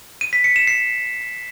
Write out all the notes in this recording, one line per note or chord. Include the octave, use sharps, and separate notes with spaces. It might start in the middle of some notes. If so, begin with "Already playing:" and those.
D#7
B6
C#7
E7
C7